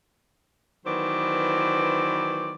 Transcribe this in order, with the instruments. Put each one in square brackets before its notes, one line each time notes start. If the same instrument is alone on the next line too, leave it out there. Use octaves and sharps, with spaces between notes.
[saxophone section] D#3 E3 F#3 B3 C5 D5